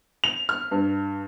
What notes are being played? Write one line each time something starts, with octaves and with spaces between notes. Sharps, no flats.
F7
F6
G2